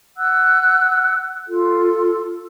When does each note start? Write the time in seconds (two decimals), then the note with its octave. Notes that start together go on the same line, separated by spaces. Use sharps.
0.16 F#5 E6 F#6
1.47 F4 A4